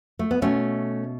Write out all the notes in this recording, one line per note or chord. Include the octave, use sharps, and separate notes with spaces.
A3
B3
B2 A3 C#4